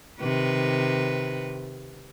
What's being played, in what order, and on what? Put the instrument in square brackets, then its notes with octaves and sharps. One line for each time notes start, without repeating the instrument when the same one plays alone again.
[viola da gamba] C3 D#3 B4